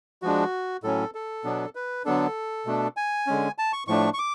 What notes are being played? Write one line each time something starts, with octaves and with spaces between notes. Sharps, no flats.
F3 G#3 D4 F#4
A2 F#3 C#4 A4
A4
B2 F#3 B3 D4
B4
D3 F#3 B3 D4 A4
B2 A3 D4
G#5
D3 G#3 C#4
A5
C#6
A2 F3 A3 D4 C#6
C#6
D6